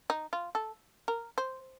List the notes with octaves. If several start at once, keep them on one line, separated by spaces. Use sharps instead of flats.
D#4
F4
A4
A#4
C5